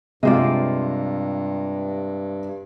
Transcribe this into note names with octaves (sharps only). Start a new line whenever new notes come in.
G2 C3 G#3 F4 C5 D5